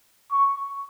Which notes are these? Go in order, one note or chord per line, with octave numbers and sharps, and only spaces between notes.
C#6